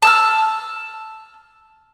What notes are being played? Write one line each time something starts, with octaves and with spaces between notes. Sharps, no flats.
A5 E6 F6